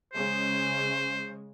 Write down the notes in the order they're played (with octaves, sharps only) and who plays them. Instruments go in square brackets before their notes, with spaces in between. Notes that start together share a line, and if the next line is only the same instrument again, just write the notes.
[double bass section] C#3 G#3 [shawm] C5